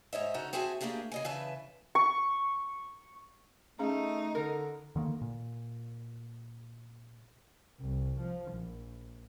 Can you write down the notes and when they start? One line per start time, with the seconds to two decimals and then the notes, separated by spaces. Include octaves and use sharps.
0.13 G#2 C#5 D#5 E5
0.34 C#3 C#4 D#4 F#4 A4
0.53 C4 F#4 G#4 E5 G#5 A5
0.81 A3 A#3 D4 G4 G#4
1.12 C#3 D#5 G#5
1.25 C#3 E3 B4 E5 G#5 A5
1.95 C#6
3.79 A3 C#4 D#4 G#4 F5
4.35 D3 A#4
4.96 D3 D#3 A#3
5.22 A#2
7.81 C2
8.20 F3
8.53 A#1